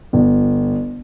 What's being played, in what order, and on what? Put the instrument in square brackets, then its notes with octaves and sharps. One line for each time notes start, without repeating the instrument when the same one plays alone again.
[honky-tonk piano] G1